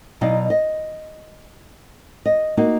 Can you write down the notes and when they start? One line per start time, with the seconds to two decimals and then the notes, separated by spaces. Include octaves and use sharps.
0.21 B2 F#3 D#4 D5 D#5 F5
0.50 D#5
2.26 D#5
2.57 A#3 D#4 F#4